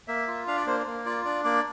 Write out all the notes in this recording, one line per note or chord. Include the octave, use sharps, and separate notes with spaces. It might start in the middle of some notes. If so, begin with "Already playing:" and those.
A#3 E5
F4
D4 F5
D5
A#3 C5
A#3
F4 D5
D4 D5
A#3 D5